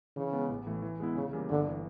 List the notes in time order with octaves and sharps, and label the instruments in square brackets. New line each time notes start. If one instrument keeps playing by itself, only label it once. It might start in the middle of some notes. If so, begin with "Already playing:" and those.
[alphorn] C#3 [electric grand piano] E3
[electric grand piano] G#3 B3
A1
A2 E3 A3
E3
G#3 B3 E4
[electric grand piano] C#2 [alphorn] C#3
[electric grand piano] C#3 E3 G3 A#3
[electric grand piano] G1 [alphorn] D3
[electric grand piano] E3